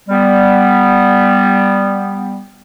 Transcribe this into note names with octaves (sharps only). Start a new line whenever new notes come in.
G3 B3